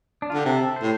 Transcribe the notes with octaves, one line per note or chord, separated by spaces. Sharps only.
D4
F4
D3 G4
C3 A4
C5
A2